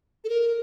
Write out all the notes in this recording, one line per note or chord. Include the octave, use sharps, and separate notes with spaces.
A4
A#4